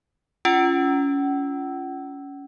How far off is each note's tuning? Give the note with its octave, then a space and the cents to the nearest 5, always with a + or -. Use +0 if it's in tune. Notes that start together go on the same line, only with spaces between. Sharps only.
C#4 +20 F4 -20 F#5 +40